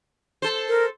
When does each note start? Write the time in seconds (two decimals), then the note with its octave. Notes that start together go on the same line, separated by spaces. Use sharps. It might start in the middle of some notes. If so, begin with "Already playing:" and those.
0.42 A4 C5
0.69 A#4